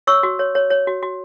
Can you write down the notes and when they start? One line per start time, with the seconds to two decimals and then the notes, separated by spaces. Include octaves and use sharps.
0.07 C#5 C#6 E6
0.23 F#4
0.39 C#5
0.55 C#5
0.70 C#5
0.87 F#4
1.03 F#4